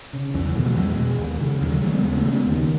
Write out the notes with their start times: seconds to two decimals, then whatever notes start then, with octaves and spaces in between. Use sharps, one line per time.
0.13 C#3
0.34 E2 E3
0.45 E3
0.55 B2 D#3 F#3
0.66 F#3 A3
0.76 E2 E3 G#3
0.98 B2
1.19 D#2
1.40 C#3
1.61 D#2 D#3 F#3
1.72 E3 G#3
1.82 C#3 F#3 A3
1.92 G#3 B3
2.03 D#2 G#3 B3
2.17 A3 C#4
2.24 C#3
2.31 G#3 B3
2.45 D#2 D#3